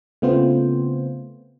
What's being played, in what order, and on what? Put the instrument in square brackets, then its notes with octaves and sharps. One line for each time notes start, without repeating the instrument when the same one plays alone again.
[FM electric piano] C#3 A3 B3 C4 F4 C5